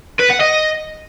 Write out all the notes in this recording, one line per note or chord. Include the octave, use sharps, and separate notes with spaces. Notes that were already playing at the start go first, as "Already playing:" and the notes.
B4
F#5
D#5